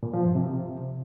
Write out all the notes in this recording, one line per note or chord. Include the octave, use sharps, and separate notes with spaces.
A#2
F3
G2
C3